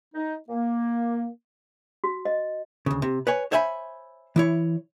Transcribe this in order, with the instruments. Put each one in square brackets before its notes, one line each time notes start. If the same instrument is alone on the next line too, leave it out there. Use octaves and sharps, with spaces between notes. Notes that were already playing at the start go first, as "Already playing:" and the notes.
[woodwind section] D#4
A#3
[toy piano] F#4
D#5
[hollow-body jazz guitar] D2 C#3
C3
B4 C#5 G#5
C5 C#5 E5 G#5 B5
E3 E4 C#5